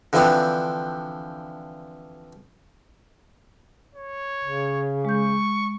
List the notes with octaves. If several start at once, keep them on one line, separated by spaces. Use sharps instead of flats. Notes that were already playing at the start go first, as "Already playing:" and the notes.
D3 E3 F3 C4 D4
C#5
C#3
G#3 C#6 G6